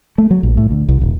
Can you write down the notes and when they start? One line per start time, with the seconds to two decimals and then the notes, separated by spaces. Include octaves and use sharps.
0.18 A3
0.31 F#3
0.43 A#1
0.57 A2
0.71 D2
0.89 C2
1.01 D#1